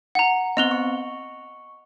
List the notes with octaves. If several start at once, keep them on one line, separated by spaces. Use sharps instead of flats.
F#5 A#5
B3 C4 D#5 F7 G7
C#6